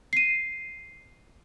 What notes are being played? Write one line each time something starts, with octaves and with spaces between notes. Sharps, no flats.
C7 D#7